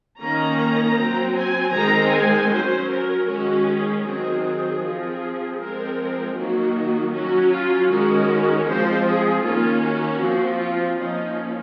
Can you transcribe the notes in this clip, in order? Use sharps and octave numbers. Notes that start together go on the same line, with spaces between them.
D#3 A#3 C#4 A#5
F#3 C4
G#5
D#3 G#3 C4 A#5
G#5
F#3 C#4 C5
A#4
D#3 G#3 C#4 F#4
G#4
D#3 F#3 C4 G#4
G#4
F3 C4
F3 G#3 C4 A#4
D#3 F#3 A#3 F#4
F#3 C#4 F#4
F4
D#3 G#3 C#4 F#4
F3 G#3 C4 C5
G#4
D#3 A#3 C#4 F4
F#4
F3 C4
F4
F3 A#3 C#4 D#4